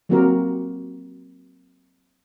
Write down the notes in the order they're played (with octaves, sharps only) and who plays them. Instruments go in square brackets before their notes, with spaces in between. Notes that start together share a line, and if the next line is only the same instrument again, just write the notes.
[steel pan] F#3 A#3 C4 F#4 G4 A#4